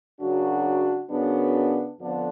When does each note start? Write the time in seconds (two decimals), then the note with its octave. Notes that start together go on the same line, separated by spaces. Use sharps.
0.20 F#2 C#3 F#3 D4 F#4
1.09 F#2 C#3 F#3 B3 D4
2.00 F2 D3 F3 B3 D4